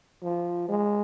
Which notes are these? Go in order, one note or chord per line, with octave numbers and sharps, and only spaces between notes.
F3
G#3